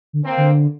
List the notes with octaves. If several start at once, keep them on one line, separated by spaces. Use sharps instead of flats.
D3
A#3 C4
D3